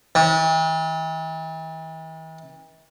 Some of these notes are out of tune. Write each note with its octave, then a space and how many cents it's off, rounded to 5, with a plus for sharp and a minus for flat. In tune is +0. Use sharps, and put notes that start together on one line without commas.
E3 -45